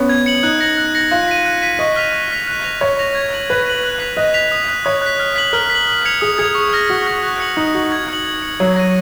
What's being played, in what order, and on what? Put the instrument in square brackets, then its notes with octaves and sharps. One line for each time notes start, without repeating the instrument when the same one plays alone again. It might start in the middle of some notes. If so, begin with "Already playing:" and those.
Already playing: [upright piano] B3 C#4
[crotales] G#6
C#7 F#7
[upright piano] D#4 [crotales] F#6
[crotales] A#6 C#7 F#7
F#6
A#6 C#7 F#7
[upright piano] F4 [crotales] F#6
[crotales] B6 D#7
F#6
B6 D#7
[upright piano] D#5 [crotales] C#6
[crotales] F6 B6 F7
C#6
F6 B6 F7
F#6
A#6 F7
[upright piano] C#5 [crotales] F#6
[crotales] A#6 F7
G#6
D#7 F#7
[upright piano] B4 [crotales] G#6
[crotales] D#7 F#7
F#6
B6 F7
[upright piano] D#5 [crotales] F#6
[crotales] B6 F7
D#6
F#6 B6
[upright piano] C#5 [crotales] D#6
[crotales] F#6 B6
F6
B6 F#7
[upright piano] A#4 [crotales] F6
[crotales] B6
F#7
D#6
G#6 C#7 F7
[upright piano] G#4 [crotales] D#6
[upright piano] G#4 [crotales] G#6 C#7 F7
[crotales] C#6
F6 A#6
[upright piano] F#4 [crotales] C#6
[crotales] F6 A#6
F#6
C#7 F#7
[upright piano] D#4 [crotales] F#6
[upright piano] F#4 [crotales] C#7 F#7
[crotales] G#6
C#7 F#7
G#6
C#7 F#7
[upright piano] F#3 [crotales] D#6
[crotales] A#6 D#7